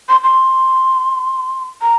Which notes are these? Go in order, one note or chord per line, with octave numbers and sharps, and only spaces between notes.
C6
C6
A#5